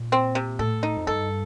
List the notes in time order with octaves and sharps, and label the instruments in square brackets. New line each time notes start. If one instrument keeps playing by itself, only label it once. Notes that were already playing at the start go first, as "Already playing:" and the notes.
Already playing: [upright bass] A#2
[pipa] C4
C3
[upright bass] A2 [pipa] A4
[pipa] D#4
[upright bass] F2
[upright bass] G2 [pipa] A4